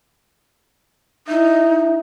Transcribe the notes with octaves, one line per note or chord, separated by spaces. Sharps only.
D#4 E4 E5